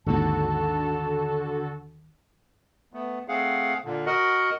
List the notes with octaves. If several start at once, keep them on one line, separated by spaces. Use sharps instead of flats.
G#1 D#2 D3 F#4 A4 A5
A3 B3
A3 C4 G#4 F5 F#5
A#2 D3
F#4 A#4 D#5 F#5